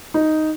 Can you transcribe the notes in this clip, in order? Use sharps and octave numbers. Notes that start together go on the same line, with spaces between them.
D#4